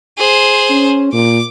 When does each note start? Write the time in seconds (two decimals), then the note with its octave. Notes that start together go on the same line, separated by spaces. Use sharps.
0.17 G#4 C5
0.70 C#4
1.13 A#2 D6